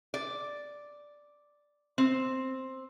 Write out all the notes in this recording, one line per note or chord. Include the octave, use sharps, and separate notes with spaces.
D5
C4